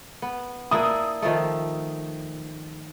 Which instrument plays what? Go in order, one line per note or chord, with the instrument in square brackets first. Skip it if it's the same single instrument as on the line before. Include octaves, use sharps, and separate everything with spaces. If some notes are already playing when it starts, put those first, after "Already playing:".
[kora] B3
[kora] A#3 D4 E4 [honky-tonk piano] D#6
[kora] D#3 F3 A3